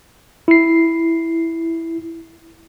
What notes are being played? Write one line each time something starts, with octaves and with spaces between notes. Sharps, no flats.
E4 C7